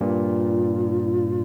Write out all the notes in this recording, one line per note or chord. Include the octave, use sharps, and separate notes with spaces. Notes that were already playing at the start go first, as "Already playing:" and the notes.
G2 A#2 F4